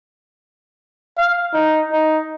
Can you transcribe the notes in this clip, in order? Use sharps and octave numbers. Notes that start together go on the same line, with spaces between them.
F5
D#4
D#4